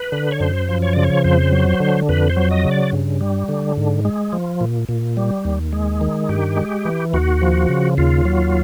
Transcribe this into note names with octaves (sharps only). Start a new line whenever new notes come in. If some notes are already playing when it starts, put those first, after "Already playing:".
Already playing: B4
D3
C#5
F#2 C5
F3
C#5
C#3 D5
C#5
F2 C5
F#3
D3
F2 B4
C5
F#3
D#5
C#3
D5
G2
G3
D3
G#2
G#3
F3
A#2
A#2
G3
D#2
G#3
D#3
G2 G4
G#3
E3
D#2 F#4
F3
C#3
D#2 F4
F#3